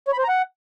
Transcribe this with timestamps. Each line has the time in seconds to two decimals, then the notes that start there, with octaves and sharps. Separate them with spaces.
0.08 C#5
0.13 B5
0.18 C5
0.24 A#5
0.29 F#5